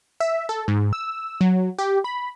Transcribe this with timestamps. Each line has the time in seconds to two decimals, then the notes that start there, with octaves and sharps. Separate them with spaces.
0.20 E5
0.49 A4
0.68 G#2
0.93 E6
1.41 F#3
1.79 G4
2.04 B5